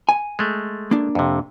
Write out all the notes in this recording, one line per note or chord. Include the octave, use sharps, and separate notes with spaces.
G#5
G#3 A3
A#3 D4
F2 C3